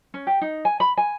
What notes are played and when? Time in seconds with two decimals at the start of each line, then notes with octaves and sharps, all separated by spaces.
0.14 C#4
0.27 G4
0.41 D#4
0.65 G#5
0.80 B5
0.97 G#5